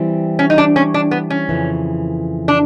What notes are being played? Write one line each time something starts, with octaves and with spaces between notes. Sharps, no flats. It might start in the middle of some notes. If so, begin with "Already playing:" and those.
Already playing: E3 G3 C4
C#4
D#4
D4
C#4
D4
B3
C#4
F2 C#3 E3
D4